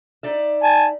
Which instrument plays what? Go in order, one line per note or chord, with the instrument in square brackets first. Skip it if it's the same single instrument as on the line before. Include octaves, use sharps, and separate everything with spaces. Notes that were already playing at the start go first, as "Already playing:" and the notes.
[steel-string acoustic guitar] D#4 D5 E5
[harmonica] G#5 A5